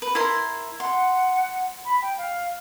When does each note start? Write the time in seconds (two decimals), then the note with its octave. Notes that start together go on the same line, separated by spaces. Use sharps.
0.02 B4
0.15 E4 A#4 C6
0.80 F#5 C6
1.85 B5
2.02 G5
2.18 F5